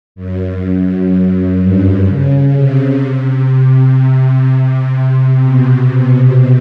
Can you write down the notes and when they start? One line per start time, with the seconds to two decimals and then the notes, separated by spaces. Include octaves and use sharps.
0.16 F#2
1.60 G2
2.07 C#3
2.55 C3
3.98 C3
4.47 C3
4.95 C3
5.43 B2